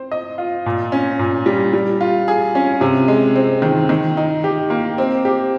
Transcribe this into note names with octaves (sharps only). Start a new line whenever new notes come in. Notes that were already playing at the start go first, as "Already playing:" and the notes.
Already playing: C4 C5
D#5
F4
A#2
C#4
A#2
G3
G3
F4
G#4
C#4
C3
G#3
C4
D#3
D#3
D#4
G4
A#3
C4
G4